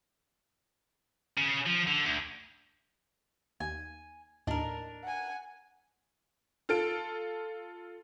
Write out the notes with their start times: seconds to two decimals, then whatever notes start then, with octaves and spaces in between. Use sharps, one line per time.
1.38 C#3
1.66 F3
1.87 D3
2.06 D2
3.60 D#2 G#5
4.47 D#2 A2 D4 A#4 D#5
5.03 F#5 G#5
6.69 F4 A4 D7